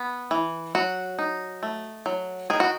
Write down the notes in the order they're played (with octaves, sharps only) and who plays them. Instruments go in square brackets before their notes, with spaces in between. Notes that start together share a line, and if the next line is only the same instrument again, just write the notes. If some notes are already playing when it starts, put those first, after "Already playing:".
Already playing: [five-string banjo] B3
E3
F#3 F#4
D#4
A3
F#3
D#3 G#4
F#4